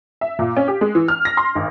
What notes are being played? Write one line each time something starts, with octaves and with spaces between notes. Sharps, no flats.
E5
A#2
C#4
G4
G#3
E3
F6
A#6
C6
G#1